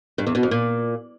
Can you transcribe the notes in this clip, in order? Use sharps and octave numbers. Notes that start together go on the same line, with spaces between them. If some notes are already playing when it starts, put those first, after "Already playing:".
G2
E2
B2
F2
A#2